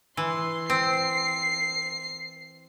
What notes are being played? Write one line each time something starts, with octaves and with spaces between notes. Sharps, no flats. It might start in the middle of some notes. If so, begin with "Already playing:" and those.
E3 C6
C4 C7